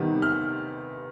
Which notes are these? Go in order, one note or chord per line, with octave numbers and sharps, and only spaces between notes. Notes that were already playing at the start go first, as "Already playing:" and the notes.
Already playing: C3 D#3 G3 B3
F6